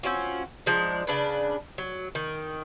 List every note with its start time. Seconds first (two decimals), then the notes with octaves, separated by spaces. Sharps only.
0.03 C4 C#4 F4 F#4
0.66 F3 G#3 D4 D#4
1.07 C#3 D4 B4
1.78 F#3
2.15 D#3